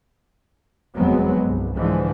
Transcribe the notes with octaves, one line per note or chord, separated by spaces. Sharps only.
F1 E2 F#3 G#3 B3 C4
C2 G2
G#2 D3 E3 F3 G#3